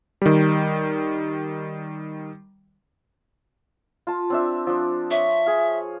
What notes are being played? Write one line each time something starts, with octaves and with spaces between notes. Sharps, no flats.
D#3 G3
F4 A5
C4 D4 E5
F3 D4
C#5 E5
G#4 F5